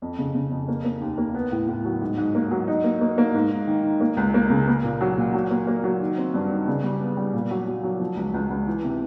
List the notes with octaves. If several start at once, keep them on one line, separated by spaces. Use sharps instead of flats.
F2
C#3
C#3
F2
A#3
A#3
D#2
A#3
B3
A2
A2
F#3
G#2
G#2
A#3
F#3
D#4
A#3
A#3
A#3
G#2
G#2
D#3
D#3
A#3
C#2
A#3
C#3
A#3
A#2
F#3
A#2
F#3
A#3
A#3
F#3
D#3
C4
G2
D#3
C#3
G3
B3
G3
A#2
F#3
F#3
F#3
F3
C#2
C#2
C#2
E3
C3